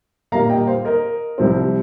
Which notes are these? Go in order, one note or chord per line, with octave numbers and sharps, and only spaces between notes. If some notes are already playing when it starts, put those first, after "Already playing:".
A#2 G3 A#3 F5 A#5
D#5 G5
C5 F5
A#4 D#5
C2 C3 F3 C4